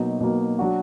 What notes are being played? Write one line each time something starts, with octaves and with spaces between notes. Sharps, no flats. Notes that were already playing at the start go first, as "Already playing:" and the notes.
Already playing: B2 F#3 A#3 D#4
B2 F#3 A#3 D#4
F#3 D4 F#4